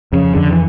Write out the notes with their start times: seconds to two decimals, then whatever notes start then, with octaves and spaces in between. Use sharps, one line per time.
0.13 F2 C#3
0.35 F2 D3
0.52 E3